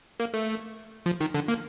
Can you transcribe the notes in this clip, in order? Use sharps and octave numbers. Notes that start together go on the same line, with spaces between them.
A#3
A3
F3
D#3
D3
A#3